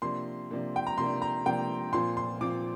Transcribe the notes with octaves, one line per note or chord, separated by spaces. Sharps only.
C3 F3 A#3 D4 C6
C3 F3 A#3 D4
G5
A#5
C3 F3 A#3 D4 C6
A#5
C3 F3 A#3 D4 G5
A#2 F3 C4 F4 C6
C6
A#2 F3 C4 F4 D6